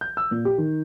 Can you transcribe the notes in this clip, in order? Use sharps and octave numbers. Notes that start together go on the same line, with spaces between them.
G6
E6
A#2
G4
D#3